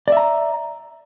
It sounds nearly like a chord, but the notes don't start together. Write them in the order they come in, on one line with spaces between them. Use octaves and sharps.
D5 E5 A#5